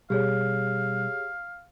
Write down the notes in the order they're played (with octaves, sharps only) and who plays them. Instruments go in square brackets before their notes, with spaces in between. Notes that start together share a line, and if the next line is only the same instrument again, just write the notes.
[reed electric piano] B2 G3 [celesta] G4 G#4 C#5 [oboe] F5